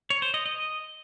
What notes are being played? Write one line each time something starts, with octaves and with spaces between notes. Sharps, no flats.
C#5
C5
D#5
D#5